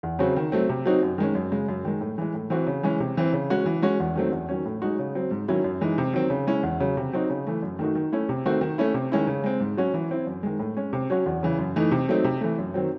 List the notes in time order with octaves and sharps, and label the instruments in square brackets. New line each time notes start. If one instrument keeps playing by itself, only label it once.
[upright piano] E2
C#3 F#3 C4 F#4
D#3
F#3 A3 C4
C3
F#3 C4 D#4 F#4
F#2
D#3 G#3 C#4
F#2
C#3 G#3
F#2
D#3 G#3
A2
E3 G#3
A2
E3 C4 F#4
C#3
E3 G#3 C#4
C3
E3 C4
C#3
G#3 C#4 F#4
E3
G#3 C#4 F#4
E2
D#3 F#3 A3 C4
E2
D#3 F#3 C#4
A2
G#3 D#4 F#4
C#3
F#3 C4
G#2
D#3 F#3 C#4 E4
F#2
E3 G#3 D#4
C3
D#3 F#3 C4
C#3
G#3 C#4 E4
E2
C#3 F#3
C3
F#3 C4 D#4 F#4
C#3
E3 A3
F#2
D#3 A3 D#4 F#4
D#3
A3 C#4 E4
C3
D#3 A3 C4 F#4
D#3
A3 C#4 E4
C3
D#3 G#3 C#4 E4
C#3
G#3 C4
G#2
F#3 C#4 F#4
E3
C4 E4
F#2
D#3 G#3
A2
G#3 C#4
C3
F#3 C#4 F#4
E2
C#3 E3
F#2
E3 A3 D#4
C3
F#3 A3 C4 D#4
C3
E3 A3
F#2
D#3 F#3 C4